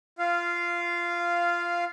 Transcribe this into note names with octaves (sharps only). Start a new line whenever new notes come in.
F4 F5